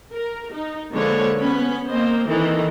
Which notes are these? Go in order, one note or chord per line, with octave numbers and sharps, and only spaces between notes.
A#4
D#4
D3 F3 G#3 A#3 B4 C#5
B3 C#4 B5
A#3 C4 C5 D#5
D#3 E3 A4 D#5